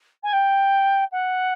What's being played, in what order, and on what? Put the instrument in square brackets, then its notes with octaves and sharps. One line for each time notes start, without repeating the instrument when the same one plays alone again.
[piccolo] G#5
G5
F#5